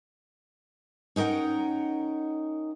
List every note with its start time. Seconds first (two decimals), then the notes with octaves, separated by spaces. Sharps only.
1.16 C#4 D#4 A#4 F#5 G5